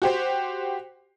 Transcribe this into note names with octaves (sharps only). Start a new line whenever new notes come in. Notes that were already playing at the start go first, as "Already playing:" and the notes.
F#4 G4 C5